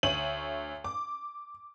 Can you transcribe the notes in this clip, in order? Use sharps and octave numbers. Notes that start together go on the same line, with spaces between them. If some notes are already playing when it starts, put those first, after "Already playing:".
D2 C#5 D#7 F#7
D6